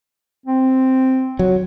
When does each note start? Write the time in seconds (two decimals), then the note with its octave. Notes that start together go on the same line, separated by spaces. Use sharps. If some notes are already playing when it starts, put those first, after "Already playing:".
0.46 C4
1.39 F#3